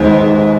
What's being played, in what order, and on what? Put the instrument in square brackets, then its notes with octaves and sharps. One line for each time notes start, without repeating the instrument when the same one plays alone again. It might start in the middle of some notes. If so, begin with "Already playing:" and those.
Already playing: [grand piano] D#2 D#3 G#3 B3 [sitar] G#2